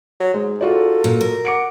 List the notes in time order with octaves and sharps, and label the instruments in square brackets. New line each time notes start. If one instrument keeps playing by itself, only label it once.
[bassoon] F#3
[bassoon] G#2 [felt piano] G#3
[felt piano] F4 F#4 D5 [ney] A4
[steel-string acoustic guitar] A#2
A#4
[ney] F#5 [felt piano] D6 C#7 D7